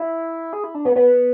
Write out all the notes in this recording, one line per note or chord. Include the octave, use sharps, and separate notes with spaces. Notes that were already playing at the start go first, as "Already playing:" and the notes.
Already playing: E4
G#4
E4
D4
B3
B3